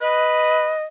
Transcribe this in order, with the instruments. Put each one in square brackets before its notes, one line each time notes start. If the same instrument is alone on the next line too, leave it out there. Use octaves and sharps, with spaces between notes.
[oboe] B4 [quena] D#5